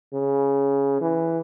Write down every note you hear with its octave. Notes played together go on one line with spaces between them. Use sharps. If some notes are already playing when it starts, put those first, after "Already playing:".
C#3
E3